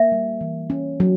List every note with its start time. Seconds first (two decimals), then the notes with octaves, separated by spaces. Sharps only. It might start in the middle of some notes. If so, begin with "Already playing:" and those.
Already playing: A#3 E5
0.12 G3
0.41 E3
0.70 C#4
1.00 F#3